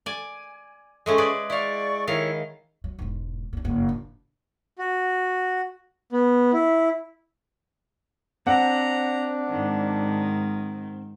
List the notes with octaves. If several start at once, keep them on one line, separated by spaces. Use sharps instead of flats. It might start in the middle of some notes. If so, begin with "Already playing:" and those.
D5 G#5
G#3 A3 C#4
G#4 B4 D5
E4 D5 F5 C#6
D#3 E4 C#5 F5
F#3
E1 G#2
A#3 D4
F#1 G2
A1 D4
F#4
B3
E4
C4 D4 F#5 A#5
G#2 D#3